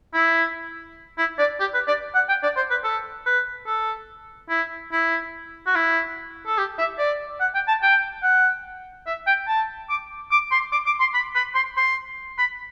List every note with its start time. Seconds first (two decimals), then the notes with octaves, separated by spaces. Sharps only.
0.14 E4
1.18 E4
1.39 D5
1.60 G4
1.74 B4
1.87 D5
2.15 F#5
2.29 G5
2.43 D5
2.56 C5
2.70 B4
2.84 A4
3.26 B4
3.67 A4
4.50 E4
4.92 E4
5.66 F#4
5.75 E4
6.47 A4
6.58 G4
6.78 E5
6.98 D5
7.40 F#5
7.55 G5
7.68 A5
7.83 G5
8.23 F#5
9.07 E5
9.27 G5
9.48 A5
9.90 D6
10.31 D6
10.52 C6
10.72 D6
10.86 D6
11.00 C6
11.14 B5
11.35 B5
11.55 C6
11.77 C6
12.39 B5